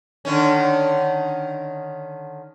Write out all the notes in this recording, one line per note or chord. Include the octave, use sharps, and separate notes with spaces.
D3 D#3 C#4